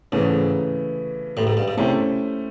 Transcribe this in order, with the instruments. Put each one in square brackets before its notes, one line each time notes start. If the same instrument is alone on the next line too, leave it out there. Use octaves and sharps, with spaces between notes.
[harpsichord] G#2 [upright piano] C#3 E3 A3 C#4
[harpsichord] A1 A2
G#2
G2
G#2
[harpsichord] C3 [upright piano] A3 C#4 E4 G4 C5